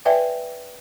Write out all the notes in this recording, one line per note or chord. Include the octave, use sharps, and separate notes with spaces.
B4 D5 E5 G5 G#5